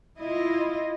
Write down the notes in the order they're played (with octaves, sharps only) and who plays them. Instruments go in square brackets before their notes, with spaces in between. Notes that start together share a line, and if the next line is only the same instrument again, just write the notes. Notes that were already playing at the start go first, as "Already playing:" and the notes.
[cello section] E4 F4 D#5